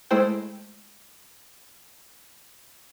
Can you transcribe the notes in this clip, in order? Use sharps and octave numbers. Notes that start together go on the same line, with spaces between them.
G#3 A3 E4 C5 G5